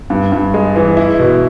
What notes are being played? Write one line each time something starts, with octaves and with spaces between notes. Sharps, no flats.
G2
G2
G#3
E3
E4
B2